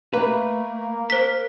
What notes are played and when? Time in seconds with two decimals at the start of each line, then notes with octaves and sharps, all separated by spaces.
0.13 A3 A#3 B4
1.10 A#4 C5 B6